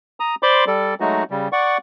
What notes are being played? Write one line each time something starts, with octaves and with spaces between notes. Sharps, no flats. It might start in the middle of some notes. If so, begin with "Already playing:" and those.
A#5 D#6
C5 D5 B5 C6 D6
G3 A4 D5
F#3 G#3 A3 D#4 F#4
C#3 G3
D5 F#5 C#6